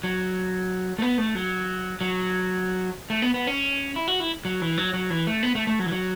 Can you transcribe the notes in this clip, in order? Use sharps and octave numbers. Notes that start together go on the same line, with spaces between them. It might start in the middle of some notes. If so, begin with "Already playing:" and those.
F#3
A3
B3
A3
F#3
F#3
A3
B3
B3
C#4
E4
F#4
E4
F#3
E3
F#3
F#3
E3
A3
B3
A3
A3
F#3
E3
F#3